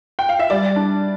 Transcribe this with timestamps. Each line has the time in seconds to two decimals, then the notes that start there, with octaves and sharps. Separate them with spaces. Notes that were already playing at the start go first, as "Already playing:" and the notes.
0.19 G5
0.29 F5
0.39 E5
0.50 G3 D5
0.76 D4